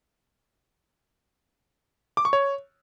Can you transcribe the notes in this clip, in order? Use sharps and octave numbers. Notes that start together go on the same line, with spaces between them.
D6
C#6
C#5